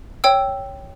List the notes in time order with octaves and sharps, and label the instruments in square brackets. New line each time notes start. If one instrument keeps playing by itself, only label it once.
[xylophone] C#5 G5 E6